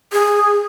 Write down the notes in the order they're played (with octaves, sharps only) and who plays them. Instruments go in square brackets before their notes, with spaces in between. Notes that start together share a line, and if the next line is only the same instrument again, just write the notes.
[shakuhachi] G#4